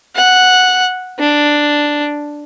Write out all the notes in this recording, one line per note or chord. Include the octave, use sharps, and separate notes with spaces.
F#5
D4